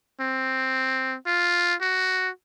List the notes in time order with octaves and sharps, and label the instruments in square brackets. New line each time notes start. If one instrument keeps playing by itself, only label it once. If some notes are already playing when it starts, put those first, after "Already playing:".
[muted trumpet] C4
F4
F#4